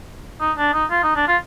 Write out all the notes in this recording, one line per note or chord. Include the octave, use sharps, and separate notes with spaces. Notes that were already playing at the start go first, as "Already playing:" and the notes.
D#4
D4
D#4
F4
D#4
D4
F4